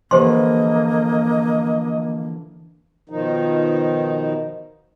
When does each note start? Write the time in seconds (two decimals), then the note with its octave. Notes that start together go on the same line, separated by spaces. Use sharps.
0.11 D3 E3 F3 A#3 G4 C5 D#5 C6
3.09 B2 D#3 F3 D#4